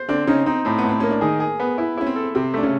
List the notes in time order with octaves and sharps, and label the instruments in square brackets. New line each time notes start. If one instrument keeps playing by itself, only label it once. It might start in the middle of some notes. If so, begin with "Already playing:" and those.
Already playing: [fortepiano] C5
[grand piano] D3 D4 [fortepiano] C4
[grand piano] C#3 C#4 [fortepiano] D#4
[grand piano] C4 [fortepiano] D#4
[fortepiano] A2 [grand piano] C4
[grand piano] B3
[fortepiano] A2
[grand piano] C4
[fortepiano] A#3 [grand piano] C#4
[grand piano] D4
[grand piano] D#3 D#4 [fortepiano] G#4
[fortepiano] G#4
B3
E4
[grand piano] C#4 [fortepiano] E4
[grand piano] C4
[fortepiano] A4
[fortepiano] C3 [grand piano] C4
[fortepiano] A3 [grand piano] D4
[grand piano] C#3 C#4